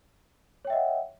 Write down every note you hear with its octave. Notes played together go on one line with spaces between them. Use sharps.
C#5 D#5 E5 F#5 G5